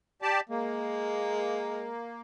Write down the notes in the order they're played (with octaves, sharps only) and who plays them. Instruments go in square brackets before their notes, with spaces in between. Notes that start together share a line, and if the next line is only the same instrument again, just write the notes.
[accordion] G4 D5 A5
[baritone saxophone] G#3 [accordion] A#3